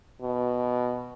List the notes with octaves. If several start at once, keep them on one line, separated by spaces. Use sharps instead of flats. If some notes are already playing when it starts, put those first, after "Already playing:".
B2